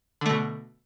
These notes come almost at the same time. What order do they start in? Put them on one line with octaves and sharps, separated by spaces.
D3 A3 B2